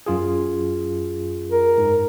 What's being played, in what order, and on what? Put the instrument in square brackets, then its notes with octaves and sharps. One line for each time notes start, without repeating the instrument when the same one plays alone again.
[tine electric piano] F#2 F4 G#4
[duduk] A#4
[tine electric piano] G#2